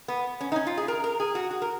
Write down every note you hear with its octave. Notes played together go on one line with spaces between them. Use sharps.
B3
C#4
D#4
C#4
F4
G#4
A#4
A#4
G#4
F#4
F#4
A#4